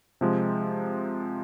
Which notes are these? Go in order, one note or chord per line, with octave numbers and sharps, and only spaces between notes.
C3 F3 G#3